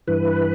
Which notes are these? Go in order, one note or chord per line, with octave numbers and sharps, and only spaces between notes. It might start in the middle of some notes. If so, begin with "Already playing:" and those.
G2 E3 B4